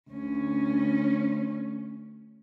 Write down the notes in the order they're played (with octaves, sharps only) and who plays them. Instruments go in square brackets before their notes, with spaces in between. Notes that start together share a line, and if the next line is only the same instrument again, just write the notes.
[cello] D2 C#4